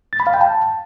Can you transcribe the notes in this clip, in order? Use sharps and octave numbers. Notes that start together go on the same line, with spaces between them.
A6
B5
F5
G5
A5